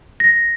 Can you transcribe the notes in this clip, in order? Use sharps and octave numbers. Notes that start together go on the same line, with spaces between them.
A#6